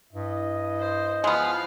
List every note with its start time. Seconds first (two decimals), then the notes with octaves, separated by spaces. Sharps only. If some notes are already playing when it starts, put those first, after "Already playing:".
0.13 G2 E4 D#5
0.80 C5
1.24 F3 G#3 B3 F5